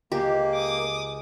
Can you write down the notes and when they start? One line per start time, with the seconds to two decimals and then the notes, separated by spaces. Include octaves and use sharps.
0.12 C#2 A#3 G4
0.54 D6 D#6